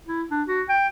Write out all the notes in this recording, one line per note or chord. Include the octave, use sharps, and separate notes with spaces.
E4
D4
F#4
G5